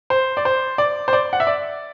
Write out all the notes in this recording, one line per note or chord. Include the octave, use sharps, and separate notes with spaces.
C5
D5
C5
D5
C5
D5
F#5
E5
D5